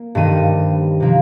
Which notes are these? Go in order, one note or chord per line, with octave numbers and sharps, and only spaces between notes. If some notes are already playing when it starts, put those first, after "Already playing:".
Already playing: A#3
G2 D#3 G3 C4 D#7
C3 F3 A#3